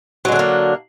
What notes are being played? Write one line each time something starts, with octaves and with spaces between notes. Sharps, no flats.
D3 F#3 G#3 A#3 D4